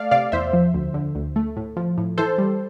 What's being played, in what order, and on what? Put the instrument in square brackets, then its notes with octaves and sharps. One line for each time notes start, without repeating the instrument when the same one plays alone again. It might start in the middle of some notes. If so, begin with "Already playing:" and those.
Already playing: [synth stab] A3 D5 F5
C3 D5 F5
E2 C5 E5
F3
D2
D3
D2
A3
A2
F3
A2
E3 A4 C5
G3